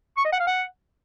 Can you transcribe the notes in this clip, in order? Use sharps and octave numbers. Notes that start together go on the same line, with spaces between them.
C#6
D#5
F#5
F5
F#5